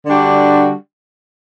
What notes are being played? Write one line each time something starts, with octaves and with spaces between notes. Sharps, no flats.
D3 G3 D4 F#4